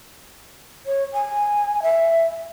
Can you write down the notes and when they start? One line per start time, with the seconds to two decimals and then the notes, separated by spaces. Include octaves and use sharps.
0.86 C#5
1.13 G#5
1.82 E5